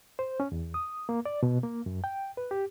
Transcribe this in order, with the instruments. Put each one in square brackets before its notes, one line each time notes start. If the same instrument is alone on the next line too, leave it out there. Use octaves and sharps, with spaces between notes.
[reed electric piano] C5
C#4
E2
D#6
A#3
D5
B2
A#3
F#2
G5
B4
G4